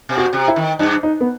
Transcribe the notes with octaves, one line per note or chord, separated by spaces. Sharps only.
B2
F#4
C3
E4
D#3
G2 D#4
D#4
B3